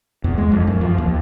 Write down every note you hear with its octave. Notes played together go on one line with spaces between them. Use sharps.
E2
G#3
F2
F#2
F3
D#2